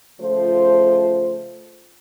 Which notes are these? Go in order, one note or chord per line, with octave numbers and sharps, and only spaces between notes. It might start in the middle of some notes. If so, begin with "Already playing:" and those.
C#3 F3 A3 F4 C5